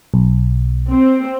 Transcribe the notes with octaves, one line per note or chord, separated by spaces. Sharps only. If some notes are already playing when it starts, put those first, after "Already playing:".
B1
C4